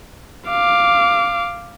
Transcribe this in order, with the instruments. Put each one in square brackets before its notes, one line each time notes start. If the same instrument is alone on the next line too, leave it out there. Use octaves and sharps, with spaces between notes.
[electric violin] F5 D6